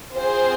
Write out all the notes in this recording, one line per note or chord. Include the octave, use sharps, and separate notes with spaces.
C4 F4 G#4 C5